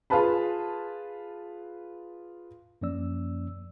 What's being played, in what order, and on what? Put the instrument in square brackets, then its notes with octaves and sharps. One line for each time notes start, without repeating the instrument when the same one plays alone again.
[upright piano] F4 G#4 B4 A5 B5
[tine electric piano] F#2 F3 A#3 C#4 D5 E6